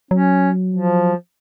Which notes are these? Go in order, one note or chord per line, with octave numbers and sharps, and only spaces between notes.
F#3 C#4
F3